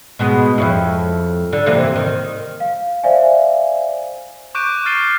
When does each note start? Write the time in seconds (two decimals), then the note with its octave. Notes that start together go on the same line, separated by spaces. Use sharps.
0.19 B2 G#3 B3
0.58 F2 C#4 E4
1.53 D3
1.66 C3 E3 A#3
1.96 D#3
2.60 F5
3.03 C5 D5 E5 F5 G#5
4.55 C#6 D6 F#6 G6 D7 D#7
4.85 F6 A6 C7 D#7 G7